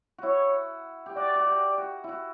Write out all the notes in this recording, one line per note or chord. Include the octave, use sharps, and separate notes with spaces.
E4 F#4 C#5
G4
F#4 D5
F#4
G4
F#4
E4 F#4